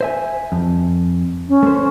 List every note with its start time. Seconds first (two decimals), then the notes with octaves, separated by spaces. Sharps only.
0.01 C5 E5 G#5
0.52 F2
1.48 C#4
1.63 A3 C5